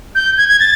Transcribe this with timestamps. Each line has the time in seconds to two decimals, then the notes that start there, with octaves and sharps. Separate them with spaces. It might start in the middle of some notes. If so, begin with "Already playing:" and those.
0.15 G6
0.37 G#6
0.48 G#6
0.60 A6